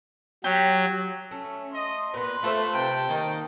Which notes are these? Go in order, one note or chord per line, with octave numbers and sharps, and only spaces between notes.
F#3 G4
A3 C#4
D#5 C6
A#2 B3 B4
A3 F4 C5
C3 G5 A5
D#3 A#3